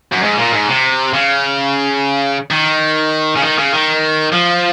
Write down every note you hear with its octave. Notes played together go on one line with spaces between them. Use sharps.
F#2
G#2
A#2
G#2
C3
C#3
D#3
C#3
D#3
C#3
D#3
F3